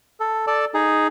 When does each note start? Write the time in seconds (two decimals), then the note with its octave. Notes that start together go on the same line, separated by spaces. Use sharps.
0.20 A4
0.47 A4 D5 A5
0.74 D#4 G#4